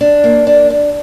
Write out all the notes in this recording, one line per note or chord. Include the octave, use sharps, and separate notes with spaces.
D4
A#3
D4
D4